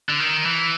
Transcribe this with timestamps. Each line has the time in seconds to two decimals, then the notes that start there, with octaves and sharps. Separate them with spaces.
0.09 D3
0.20 D#3
0.46 E3